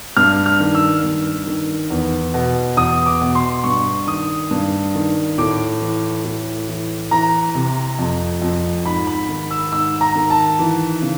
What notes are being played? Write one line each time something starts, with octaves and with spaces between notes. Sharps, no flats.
G2 F6
F6
D#3
E6
G2
D#3
E2
B2
E2 D#6
D6
B2
C6
G2 C#6
D#3 D#6
G2
D#3
A2 D6
E3
A2
E3
E3 A#5
C3
F2
F2
G#2 B5
B5
D#3
E6
G#2 E6
A#5
D#3
A5
E3
C#3